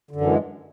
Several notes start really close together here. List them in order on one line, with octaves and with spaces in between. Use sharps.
D3 F#2 E3 G#3